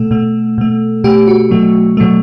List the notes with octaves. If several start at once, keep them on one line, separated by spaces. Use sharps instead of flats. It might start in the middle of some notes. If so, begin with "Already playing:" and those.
Already playing: B2 A3 A4
B2 A3
B2 A3
B2 A3 G4
F#4
B2 F#3 A3
B2 F#3 A3